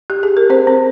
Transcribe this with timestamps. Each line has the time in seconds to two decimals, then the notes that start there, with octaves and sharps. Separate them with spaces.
0.10 G4
0.23 G#4
0.37 A#4
0.50 C4 C5
0.67 C4